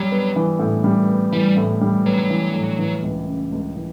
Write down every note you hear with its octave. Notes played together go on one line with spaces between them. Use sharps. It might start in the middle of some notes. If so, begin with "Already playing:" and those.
Already playing: F#3 G3
B3
E3
A2
G3
B3
E3 G3
A2
G3
F#3 B3
E3
A2
E3
C#2
C#3
C#2
E3